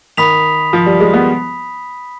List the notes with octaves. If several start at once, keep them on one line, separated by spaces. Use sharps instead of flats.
D#3 B5 D#6 B6 F7
F3
G3
G#3
B3